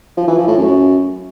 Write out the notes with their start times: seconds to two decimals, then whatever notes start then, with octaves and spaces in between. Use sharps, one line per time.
0.17 F3
0.27 E3
0.37 F3
0.47 A2
0.57 F#2